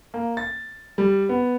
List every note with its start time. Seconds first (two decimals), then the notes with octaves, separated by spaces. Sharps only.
0.14 A#3
0.37 A6
0.98 G3
1.29 B3